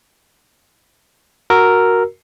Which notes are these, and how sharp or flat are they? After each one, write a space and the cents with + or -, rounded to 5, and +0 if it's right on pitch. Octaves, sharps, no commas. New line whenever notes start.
F#4 +0 A#4 +0 E6 +0